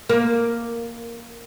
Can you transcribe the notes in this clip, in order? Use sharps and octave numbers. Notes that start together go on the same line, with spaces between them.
A#3